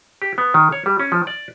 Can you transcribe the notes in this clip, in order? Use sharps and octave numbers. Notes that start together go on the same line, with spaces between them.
G4
B3
D#3
C#5
G3
C#4
F3
D5